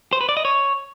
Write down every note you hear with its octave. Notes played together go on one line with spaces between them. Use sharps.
C5
B4
D5
D#5
C#5